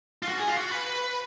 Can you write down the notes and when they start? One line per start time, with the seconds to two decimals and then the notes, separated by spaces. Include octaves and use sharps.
0.23 F4
0.28 F#4
0.38 G#4
0.47 F4
0.57 F#4
0.71 B4